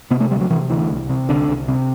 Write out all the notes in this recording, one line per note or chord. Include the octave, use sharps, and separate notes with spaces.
C3 B3
A3
D2 G3
F#3
C3 E3
D2 E3
C2
C3
C2 D3
C2
C3